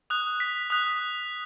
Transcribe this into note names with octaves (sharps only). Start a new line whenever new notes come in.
D#6 F#6
B6
D#6 F#6